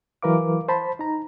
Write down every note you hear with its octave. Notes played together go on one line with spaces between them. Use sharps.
E3 F#3 A#4 B4 F5 D6
C5 A5 B5
D#4 A#5